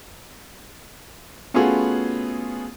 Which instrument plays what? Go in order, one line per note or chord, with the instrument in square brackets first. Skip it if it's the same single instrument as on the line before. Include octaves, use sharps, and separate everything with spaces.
[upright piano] A3 B3 C#4 F4 F#4 G#4